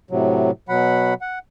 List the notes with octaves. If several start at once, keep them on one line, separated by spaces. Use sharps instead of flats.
A2 C3 F#3
B2 F#3 F#5 B5
F#5